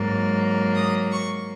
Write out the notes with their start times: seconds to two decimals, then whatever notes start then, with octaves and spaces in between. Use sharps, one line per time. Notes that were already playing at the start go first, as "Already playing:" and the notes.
Already playing: G#2 F#3 A#3
0.75 D#6
1.11 C#6